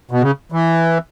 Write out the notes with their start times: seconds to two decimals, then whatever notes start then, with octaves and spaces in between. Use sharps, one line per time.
0.11 B2
0.22 C#3
0.52 E3